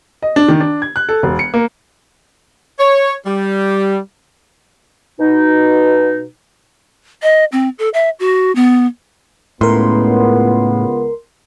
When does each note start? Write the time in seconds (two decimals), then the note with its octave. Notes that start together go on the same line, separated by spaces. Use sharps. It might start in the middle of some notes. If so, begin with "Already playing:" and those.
0.22 D#5
0.36 D4
0.48 D#3
0.60 D4
0.82 G#6
0.96 F#6
1.09 A4
1.23 E1
1.39 C#7
1.54 A#3
2.79 C#5
3.26 G3
5.20 B2 D#4
7.22 D#5
7.52 C4
7.79 A4
7.94 E5
8.20 F#4
8.55 B3
9.61 C#2 A2 B3 A#4 C6